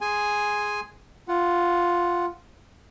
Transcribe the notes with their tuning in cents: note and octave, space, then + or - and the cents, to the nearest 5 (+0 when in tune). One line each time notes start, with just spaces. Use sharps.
G#4 +0 G#5 +0 C6 +0
F4 +0 F#5 +0